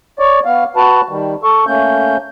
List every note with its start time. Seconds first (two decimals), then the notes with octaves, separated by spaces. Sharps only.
0.19 C#5 D5
0.45 B3 F5
0.76 F#4 B4 A5
1.09 D#3 G3
1.43 A4 C#6
1.67 A3 A#3 C#4 G6